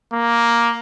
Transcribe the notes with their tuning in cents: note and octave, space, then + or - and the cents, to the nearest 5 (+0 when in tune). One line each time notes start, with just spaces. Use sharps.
A#3 +5